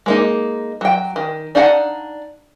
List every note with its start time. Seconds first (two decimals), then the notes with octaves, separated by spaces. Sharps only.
0.06 G#3 A#3 D#4
0.81 F#3 G5
1.16 D#3
1.55 D4 D#4 F5 F#5 A5